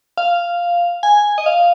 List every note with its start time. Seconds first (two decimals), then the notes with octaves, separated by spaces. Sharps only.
0.18 F5
1.03 G#5
1.38 D#5
1.46 F5